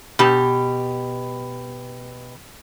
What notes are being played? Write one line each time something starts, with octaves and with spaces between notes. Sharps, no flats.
B2 G4